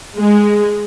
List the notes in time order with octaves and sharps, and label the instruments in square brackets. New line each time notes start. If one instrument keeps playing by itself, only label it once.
[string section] G#3